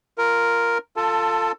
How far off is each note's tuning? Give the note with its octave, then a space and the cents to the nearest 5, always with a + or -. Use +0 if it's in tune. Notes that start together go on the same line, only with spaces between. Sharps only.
F4 +0 A#4 +0
F4 +0 A4 +20 A5 +0